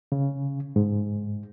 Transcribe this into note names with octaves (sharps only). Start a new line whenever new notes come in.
C#3
G#2